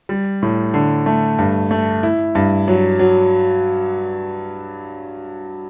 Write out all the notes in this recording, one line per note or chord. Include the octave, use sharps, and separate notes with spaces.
G3
A2
D3
A3
G2
A3
E4
G2
F#3
F#3